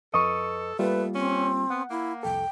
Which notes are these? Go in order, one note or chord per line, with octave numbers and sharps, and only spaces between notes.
F2 A4 B4 D#5 C#6 D#6
G3 A3 A#3 F4 B4
C4 C#4
B3 F#5
A#3 E4
C2 F2 A4 G5